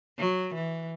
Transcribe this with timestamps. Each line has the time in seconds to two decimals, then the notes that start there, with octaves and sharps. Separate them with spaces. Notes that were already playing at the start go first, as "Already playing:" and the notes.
0.19 F#3
0.54 E3